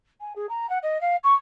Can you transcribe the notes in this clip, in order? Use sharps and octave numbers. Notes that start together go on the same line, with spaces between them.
G#5
G#4
A#5
F#5
D#5
F5
C#6